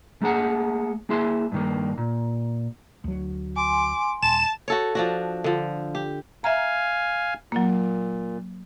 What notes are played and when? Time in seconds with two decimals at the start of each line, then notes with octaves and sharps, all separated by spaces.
0.22 A3 A#3 G#4 F#5
1.09 A#3 E4 G#4 E5 C6
1.52 G2 D#3 A#3
1.98 A#2
3.04 D2 F#3
3.56 G#5 C6 D6
4.23 D#1 A5 E7
4.68 F#4 A4 C#5
4.95 F3 D4 F#4
5.44 D3 F3
5.95 G4
6.44 E5 F5 G#5 A#5
7.52 A#2 F#3 A#3